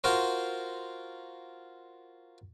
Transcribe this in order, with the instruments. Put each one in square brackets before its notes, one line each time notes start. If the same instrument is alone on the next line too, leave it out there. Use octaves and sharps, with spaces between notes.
[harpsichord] F4 F#4 A#4 C5